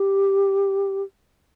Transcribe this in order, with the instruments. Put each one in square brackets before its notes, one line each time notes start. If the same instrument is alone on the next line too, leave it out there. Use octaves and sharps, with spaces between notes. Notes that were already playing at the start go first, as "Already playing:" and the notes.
Already playing: [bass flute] G4